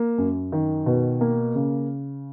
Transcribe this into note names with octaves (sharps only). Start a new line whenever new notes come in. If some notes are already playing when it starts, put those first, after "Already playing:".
Already playing: A#3
F#2
D#3
B2
A#3
C#3